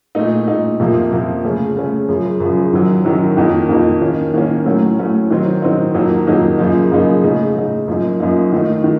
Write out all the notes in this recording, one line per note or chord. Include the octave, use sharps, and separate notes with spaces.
A#2 A3 D#4
A#2 A3 D#4
F2 C3 F3 A#3
F2 C3 F3 A#3
C#3 A3 C#4
C#3 A3 C#4
F#2 C#3 F3
F#2 C#3 F3
F#2 D#3 F#3
F#2 D#3 F#3
F2 D#3 A#3 D#4
F2 D#3 A#3 D#4
D#3 A#3 C#4
D#3 A#3 C#4
A2 F#3 A3 C#4
A2 F#3 A3 C#4
D#3 F#3 C4 D#4
D#3 F#3 C4 D#4
F2 D#3 F#3 A#3 D#4
F2 D#3 F#3 A#3 D#4
F#2 C#3 F3 A#3 D#4
F#2 C#3 F3 A#3 D#4
C#3 A3 D#4
C#3 A3 D#4
F#2 F3 A#3 D#4
F#2 F3 A#3 D#4
D#3 A3 D#4
D#3